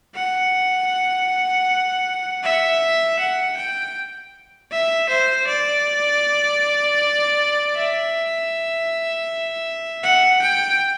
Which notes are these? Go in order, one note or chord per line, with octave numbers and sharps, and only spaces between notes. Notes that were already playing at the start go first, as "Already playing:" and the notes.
F#5
E5
F#5
G5
E5
C5
D5
E5
F#5
G5